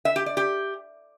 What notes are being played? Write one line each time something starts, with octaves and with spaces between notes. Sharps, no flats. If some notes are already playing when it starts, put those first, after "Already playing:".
E5
G4
D5
G4